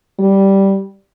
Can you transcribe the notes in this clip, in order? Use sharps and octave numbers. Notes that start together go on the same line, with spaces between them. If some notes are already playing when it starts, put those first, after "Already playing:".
G3